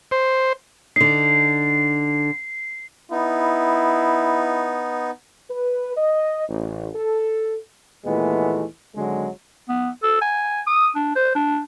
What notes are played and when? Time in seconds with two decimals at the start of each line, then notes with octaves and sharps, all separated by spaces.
0.11 C5
0.96 D3 D#4 C7
3.11 B3 D#4 E4
5.49 B4
5.96 D#5
6.48 A1
6.95 A4
8.05 D#2 A#2 E3 G#3 A3 B3
8.95 G#1 D3 F#3 G#3
9.69 B3
10.03 A4
10.21 G#5
10.67 D#6
10.95 D4
11.16 C5
11.35 D4